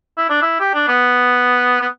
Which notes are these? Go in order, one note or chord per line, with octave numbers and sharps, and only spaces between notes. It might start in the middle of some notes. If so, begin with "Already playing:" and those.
E4
D4
E4
G4
D4
B3
B3